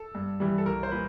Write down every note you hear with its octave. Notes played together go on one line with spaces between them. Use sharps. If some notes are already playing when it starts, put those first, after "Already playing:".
Already playing: A4
G2
E3 G3
A4
C2 A#4
C5
A#2 B4